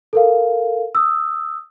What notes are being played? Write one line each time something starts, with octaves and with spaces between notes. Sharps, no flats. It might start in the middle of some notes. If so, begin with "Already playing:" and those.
A4 A#4 F5
D#6 E6